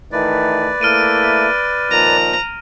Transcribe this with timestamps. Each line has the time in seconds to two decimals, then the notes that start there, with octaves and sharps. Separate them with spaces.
0.12 D#3 E3 A3 B4 D5
0.81 A3 A#3 E4 F6 D7 D#7
1.91 A#2 D#3 F3 A#5